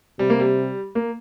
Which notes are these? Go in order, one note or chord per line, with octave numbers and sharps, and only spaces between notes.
C3 G3
A#3
G3
A#3